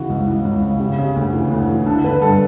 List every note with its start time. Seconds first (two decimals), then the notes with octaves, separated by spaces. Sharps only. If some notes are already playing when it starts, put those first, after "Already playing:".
Already playing: C#3 E3 F#4
0.09 C#2
0.27 E3
0.45 C#2
0.62 C#3
0.80 C#3 G4
0.98 C#3
1.16 D2
1.34 E3
1.51 D2
1.69 E3
1.86 D3 A4
2.04 D3 B4
2.22 G2 A4